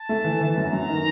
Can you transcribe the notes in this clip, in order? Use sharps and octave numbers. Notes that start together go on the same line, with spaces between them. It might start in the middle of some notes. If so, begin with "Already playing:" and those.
Already playing: A5
A3
E3
E3
F#2 A#5
F#2
D#3